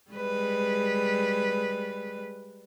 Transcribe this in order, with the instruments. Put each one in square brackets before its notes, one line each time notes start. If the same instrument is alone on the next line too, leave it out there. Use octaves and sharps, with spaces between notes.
[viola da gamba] G3 G#3 B4